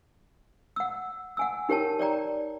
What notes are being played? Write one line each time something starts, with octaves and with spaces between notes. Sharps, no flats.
F#5 E6
F#5 G#5 E6
D#4 G4 A#4 C#5 G5 A5
C#5 D5 G5 A#5